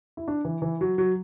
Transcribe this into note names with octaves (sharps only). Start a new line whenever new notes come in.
E4
D4
E3
E3
F#3
F#3